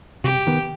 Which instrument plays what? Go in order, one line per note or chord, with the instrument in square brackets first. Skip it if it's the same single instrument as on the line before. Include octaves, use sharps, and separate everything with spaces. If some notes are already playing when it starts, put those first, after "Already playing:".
[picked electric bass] C3 [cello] G4
[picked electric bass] D#3 B3